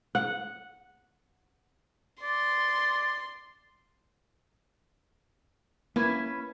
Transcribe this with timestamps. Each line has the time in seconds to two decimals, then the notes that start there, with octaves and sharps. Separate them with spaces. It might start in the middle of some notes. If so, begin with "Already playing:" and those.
0.15 F#5
2.23 D5 C6
5.96 A#3 C#4 E4 B4